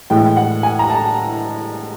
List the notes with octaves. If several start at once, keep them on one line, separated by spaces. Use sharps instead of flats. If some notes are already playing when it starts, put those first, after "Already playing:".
A2 E3 G#3 G5
F#5
G#5
A#5
A5